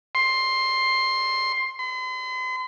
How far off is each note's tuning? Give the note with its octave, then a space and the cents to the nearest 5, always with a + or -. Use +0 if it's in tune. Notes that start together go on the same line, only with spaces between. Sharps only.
C6 +10
C6 -45